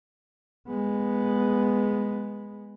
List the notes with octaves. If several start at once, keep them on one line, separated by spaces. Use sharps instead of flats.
G#3 B3